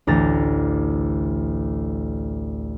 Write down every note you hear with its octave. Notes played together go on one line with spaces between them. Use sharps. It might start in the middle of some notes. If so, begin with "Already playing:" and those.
A1 D2 A#5 A6